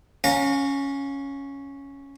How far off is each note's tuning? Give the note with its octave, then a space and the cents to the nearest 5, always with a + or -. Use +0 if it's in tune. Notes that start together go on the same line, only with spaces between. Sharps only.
C#4 +0 F5 +35 A#5 -30